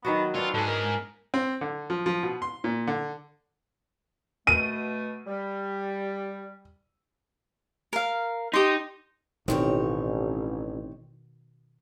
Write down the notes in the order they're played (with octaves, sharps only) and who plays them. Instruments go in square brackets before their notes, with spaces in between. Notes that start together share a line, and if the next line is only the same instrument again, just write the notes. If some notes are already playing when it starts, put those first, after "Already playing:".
[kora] D#3 F#3 F#4 [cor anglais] B3
[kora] B3 D4 C#5 [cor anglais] C4 [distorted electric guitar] F4
[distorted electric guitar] G#2 G#4 [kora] E4 [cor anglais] A4
[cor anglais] A#4
[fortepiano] C4
D3
F3
F3
B2
C6
A#2
D3
[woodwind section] B2 A3 [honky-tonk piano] D#7
[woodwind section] G3
[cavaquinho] A#4 F5
[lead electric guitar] D#4 [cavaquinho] G4 C6
[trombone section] A1 [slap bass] B2 D#3 [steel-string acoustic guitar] C4 D#4 C#5